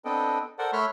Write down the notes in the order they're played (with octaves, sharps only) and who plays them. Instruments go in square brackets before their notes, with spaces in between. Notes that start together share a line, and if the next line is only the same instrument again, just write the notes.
[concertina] B3 C4 D4 A4 D#5 G5
A4 A#4 C5 D5 F#5
A3 C#5 B5 C6 F6 F#6